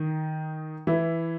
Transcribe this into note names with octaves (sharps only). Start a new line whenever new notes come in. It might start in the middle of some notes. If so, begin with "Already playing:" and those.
Already playing: D#3 D#4
E3 E4